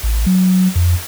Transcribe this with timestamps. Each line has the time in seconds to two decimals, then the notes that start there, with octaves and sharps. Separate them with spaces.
0.03 A1
0.26 F#3
0.75 F2